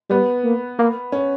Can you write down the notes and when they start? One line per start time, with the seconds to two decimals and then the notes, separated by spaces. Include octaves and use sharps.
0.10 G3 B3
0.44 A#3
0.79 A#3
1.12 C#4